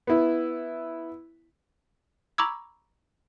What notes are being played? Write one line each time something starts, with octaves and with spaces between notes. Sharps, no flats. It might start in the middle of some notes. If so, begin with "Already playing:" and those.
B3 E4
A#5 B5 C#6 D6 E6 G#6